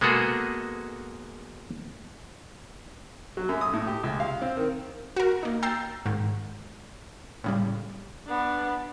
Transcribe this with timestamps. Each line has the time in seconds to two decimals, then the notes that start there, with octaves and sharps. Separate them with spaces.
0.01 G#3 A#3 B3 F#4 G#4 A4
3.37 F#3
3.49 F#2
3.61 D#6
3.73 A2
3.87 G4
4.03 C#2
4.20 F5
4.42 C4
4.57 D#3
5.16 F#4 A#4
5.43 A#3 D#4
5.63 G5 A#5 E6 G6 A6 C7
6.06 G#2 D#3
7.44 A2 C#3 G3
8.26 B3 D4